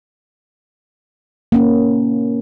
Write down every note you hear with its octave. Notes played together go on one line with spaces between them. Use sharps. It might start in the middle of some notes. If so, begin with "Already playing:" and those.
A#3 C#4